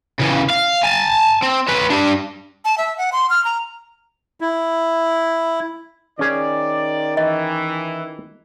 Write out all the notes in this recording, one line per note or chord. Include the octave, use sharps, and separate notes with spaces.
C#3 E3
F5
G#5 A5
C4
C#4 B4
D4 G4
A5
E5
F#5
C6
F6
A#5
E4
D#3 C#4 G#4 D5
E3 D#5